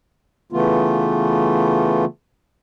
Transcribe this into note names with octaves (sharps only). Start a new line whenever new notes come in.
C#3 E3 A3 B3 F4